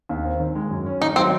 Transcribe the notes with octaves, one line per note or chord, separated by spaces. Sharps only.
D#2
C4
D#3
G#3
F#2
C#4
D#3 D#4
F#3 C4